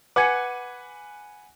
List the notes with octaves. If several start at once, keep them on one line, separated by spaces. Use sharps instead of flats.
B4 F#5 G#5 D6 G#6 C#7